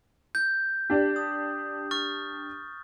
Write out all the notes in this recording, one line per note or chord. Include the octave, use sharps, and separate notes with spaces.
G6
D4 G4
D#6
C#6 F6 A6